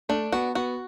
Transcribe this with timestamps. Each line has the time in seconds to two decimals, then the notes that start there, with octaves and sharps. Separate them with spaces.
0.09 A3 D4
0.32 B3 F#4
0.55 B3 F#4